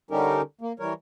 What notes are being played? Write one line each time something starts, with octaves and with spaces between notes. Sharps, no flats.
D3 G3 C#4 D#4 G4 A#4
A#3
E3 G3 A#4 C#5